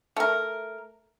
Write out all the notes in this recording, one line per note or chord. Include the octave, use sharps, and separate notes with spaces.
A3 A#4